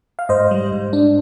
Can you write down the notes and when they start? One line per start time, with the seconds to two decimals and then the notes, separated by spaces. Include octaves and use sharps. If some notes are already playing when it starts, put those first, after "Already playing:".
0.19 F5
0.29 G#2 C5 D#5
0.51 G3
0.72 G#2
0.93 D4